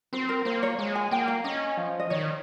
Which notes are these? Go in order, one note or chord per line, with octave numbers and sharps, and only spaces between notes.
C4 C5
A#4
A#3 C5
C#5
G#3 F5
G#5
A#3 G5
F5
C#4 D#5
F3
D#5
D#3 C#5